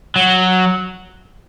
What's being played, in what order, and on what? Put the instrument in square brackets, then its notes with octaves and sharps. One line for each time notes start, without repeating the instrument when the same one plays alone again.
[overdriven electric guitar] F#3